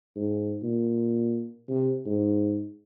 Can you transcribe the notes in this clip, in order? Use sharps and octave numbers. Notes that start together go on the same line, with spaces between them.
G#2
A#2
C3
G#2